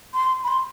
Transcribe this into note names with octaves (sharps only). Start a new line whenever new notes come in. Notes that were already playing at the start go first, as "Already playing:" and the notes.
C6
B5
C6